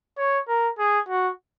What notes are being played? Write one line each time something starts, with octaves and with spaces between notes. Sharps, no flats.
C#5
A#4
G#4
F#4